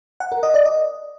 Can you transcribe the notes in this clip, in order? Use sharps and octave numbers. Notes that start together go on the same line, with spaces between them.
F#5
A#4
D#5
D5
D#5